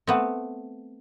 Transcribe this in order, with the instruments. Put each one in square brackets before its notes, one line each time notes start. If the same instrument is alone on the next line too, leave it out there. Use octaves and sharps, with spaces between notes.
[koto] A3 B3 C4